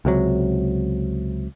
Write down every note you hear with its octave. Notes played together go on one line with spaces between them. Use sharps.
C#2 C3 F#3